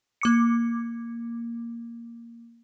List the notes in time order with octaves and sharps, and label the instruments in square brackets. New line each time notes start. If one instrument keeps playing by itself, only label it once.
[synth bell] A#3 D6 C#7